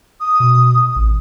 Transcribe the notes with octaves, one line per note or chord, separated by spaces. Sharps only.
D#6
B2
A1